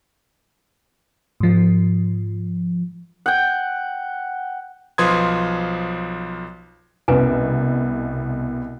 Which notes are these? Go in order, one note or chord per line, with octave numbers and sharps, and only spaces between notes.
G#2 F3
F#5 G5
B1 F3 B4 C6 D#6 G#6
C2 B2 C#4 B4 G#5